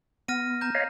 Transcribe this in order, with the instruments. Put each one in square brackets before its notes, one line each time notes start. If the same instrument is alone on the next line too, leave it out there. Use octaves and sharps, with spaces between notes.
[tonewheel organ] B3 [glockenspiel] F6 A#6 D#7
[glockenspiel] A#5 G6
[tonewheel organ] C#5 D#5 F5